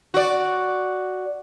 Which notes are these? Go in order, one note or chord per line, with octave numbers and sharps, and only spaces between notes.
F#4 D5